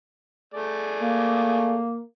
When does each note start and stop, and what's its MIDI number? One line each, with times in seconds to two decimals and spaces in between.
0.54 1.85 57
0.54 1.85 68
0.54 1.85 74
1.01 2.01 58